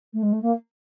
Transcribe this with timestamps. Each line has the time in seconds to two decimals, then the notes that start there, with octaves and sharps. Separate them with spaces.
0.13 A3
0.22 G#3
0.32 A3
0.42 A#3